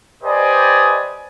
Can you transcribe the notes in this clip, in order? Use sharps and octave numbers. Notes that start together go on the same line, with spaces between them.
G4 B4 C5 D5 D#5 G#5